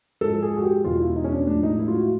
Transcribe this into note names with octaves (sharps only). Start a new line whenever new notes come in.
G#2 F3 G#3 A4
G#4
F#4
G4
E2 B2 G#3 F4
E4
D#4
C#4
D4
A2 F3 G#3 D4
D#4
E4
F4
F#4